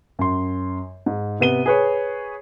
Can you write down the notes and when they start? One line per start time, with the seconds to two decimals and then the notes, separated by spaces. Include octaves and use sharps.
0.19 F#2 C6
1.06 G#2
1.40 C3 B3 D#7 G7
1.66 G#4 B4 C#5